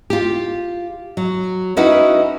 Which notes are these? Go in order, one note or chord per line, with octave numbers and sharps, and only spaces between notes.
F4 G4
F#3
C#4 D#4 E4 F#4 B4 F#5